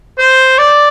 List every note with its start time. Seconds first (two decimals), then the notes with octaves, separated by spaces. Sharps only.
0.19 C5
0.58 D5